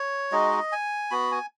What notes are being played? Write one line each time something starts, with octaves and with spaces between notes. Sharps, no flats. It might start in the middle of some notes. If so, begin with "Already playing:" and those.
Already playing: C#5
G#3 D#4 F#4 D#5
G#5
B3 F#4 B5
G#5